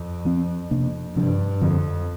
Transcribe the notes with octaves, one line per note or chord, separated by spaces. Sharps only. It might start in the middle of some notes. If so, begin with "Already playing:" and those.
Already playing: F2
F3 C4
C3 A#3 D4
G2 C3 F3 D4
F2 D3 F3 C4